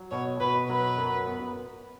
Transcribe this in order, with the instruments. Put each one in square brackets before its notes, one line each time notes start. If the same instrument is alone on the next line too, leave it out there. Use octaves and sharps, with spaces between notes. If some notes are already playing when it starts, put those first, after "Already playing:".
Already playing: [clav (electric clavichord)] F#3
[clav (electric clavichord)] B2 [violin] C#5
[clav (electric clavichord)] B2 [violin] B4
[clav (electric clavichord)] F#3 [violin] B4
[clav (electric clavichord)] F#2
B3